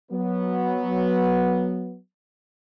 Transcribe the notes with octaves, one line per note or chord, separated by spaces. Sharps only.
F#3 B3